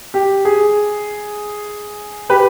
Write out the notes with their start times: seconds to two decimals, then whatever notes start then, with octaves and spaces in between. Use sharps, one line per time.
0.14 G4
0.45 G#4
2.29 G4 B4